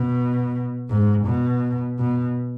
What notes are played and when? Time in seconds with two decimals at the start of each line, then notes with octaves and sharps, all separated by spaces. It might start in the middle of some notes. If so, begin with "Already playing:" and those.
Already playing: B2
0.90 G#2
1.26 B2
1.99 B2